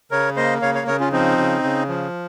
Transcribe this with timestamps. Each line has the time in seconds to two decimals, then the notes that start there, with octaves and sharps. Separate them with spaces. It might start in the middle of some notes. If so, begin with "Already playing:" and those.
0.11 C#3 A#4 C#5
0.36 A#3 C5 D#5
0.62 C#3 C#5 F5
0.74 C#5 F5
0.87 C#3 A#4 C#5
1.00 C#4 F4
1.12 F3 C4 D#4
1.38 C#3
1.64 C#3
1.88 F3